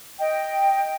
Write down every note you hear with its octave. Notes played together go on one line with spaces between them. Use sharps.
D#5 G5